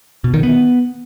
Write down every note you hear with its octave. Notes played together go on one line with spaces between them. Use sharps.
B2
D#3
B3